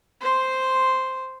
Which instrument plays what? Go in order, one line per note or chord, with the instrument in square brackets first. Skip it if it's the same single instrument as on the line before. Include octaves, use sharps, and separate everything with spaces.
[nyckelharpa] C5 C6